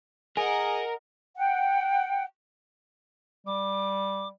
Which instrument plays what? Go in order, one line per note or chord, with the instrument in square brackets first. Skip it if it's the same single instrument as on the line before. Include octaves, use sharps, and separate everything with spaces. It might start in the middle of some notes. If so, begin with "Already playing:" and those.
[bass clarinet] G#4 [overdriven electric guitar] A#4 [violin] D#5 F#5 [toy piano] G#5
[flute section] F#5 G5
[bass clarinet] G3 [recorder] D6